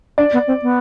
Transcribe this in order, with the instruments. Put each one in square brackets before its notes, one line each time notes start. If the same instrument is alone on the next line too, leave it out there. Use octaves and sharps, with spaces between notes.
[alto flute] D4 [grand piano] D5
[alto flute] B3
C4
B3